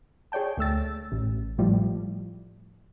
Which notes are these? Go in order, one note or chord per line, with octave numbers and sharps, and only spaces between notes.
G#4 C#5 D5 G5 A5
D2 A3 E6 A6
A1
A2 F3 G3 A3